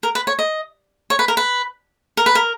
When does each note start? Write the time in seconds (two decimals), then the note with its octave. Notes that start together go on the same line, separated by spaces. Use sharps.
0.03 A#4
0.15 B4
0.27 C#5
0.39 D#5
1.10 C#5
1.19 B4
1.28 A#4
1.37 B4
2.17 A#4
2.26 B4
2.35 A#4